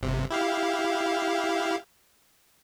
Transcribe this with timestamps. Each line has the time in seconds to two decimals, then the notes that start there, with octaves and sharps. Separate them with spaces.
0.01 G1 C3
0.30 E4 G4 F5